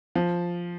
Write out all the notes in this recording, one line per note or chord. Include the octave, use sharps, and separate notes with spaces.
F3